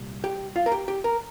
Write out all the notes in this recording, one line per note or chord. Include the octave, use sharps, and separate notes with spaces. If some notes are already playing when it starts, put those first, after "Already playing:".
Already playing: C2 A#2 G3
G4
F4
A#4
G4
G4
A#4